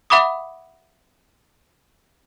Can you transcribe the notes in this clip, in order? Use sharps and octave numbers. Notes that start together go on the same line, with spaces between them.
E5 F#5 B5 D6 D#6